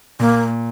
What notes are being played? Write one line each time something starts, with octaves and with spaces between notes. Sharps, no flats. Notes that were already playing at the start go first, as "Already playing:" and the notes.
A#2 A#3